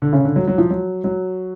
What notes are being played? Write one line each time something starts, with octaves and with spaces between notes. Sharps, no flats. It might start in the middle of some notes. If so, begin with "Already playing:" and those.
D3
C#3
D3
F#3
F#3
F3
F#3
F#3